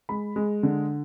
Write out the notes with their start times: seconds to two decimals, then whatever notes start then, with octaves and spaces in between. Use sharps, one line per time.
0.09 G#3 B5
0.36 G#3
0.63 D3